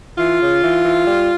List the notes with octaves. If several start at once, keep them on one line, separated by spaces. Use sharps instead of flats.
E3 F4
C#3
E3
E3
G3